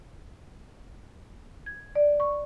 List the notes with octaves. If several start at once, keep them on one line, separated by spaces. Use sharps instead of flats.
G#6
D5
C#6